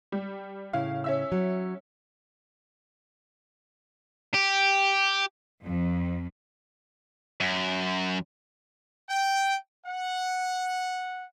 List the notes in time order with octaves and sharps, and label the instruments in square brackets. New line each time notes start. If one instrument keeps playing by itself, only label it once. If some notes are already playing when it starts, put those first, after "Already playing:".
[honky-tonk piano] G3
[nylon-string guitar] A2 C#3 E4 [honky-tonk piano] F5
[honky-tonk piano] C#4 E5 E6
[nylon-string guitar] F#3
[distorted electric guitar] G4
[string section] F2
[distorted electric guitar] F#2
[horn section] G5
F#5